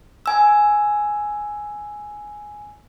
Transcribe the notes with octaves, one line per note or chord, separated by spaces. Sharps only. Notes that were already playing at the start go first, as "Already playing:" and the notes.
G#5 E6